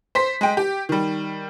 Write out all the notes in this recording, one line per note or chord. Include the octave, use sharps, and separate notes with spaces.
C5 C6 B6
G#3 G5
G4
D#3 G3